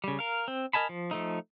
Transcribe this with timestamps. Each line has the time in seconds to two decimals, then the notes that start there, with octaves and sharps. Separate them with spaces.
0.04 C#3 G3
0.19 A#4 F5
0.48 C4
0.73 A#4 D#5 G#5 A5 B5
0.89 F3
1.11 F3 A3 D#4